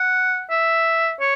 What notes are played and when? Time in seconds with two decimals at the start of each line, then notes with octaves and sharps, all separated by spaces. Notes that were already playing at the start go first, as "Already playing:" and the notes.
Already playing: F#5
0.51 E5
1.20 C#5